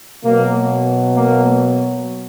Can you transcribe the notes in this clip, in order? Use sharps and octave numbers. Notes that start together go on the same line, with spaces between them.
B2 F#3 A#3
A#3